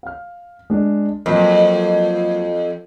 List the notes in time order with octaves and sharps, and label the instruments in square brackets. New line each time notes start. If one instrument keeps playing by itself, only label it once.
[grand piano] F5 F6
G#3 D4
[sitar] F2 [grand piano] F#3 A#3